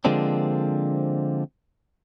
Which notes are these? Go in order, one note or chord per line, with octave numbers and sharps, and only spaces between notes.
D3 F3 G#3 A#3 C4 D4